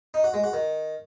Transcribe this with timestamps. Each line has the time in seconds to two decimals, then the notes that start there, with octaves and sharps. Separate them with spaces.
0.14 D#4
0.24 F#4
0.34 G#3
0.44 F#4
0.53 D#3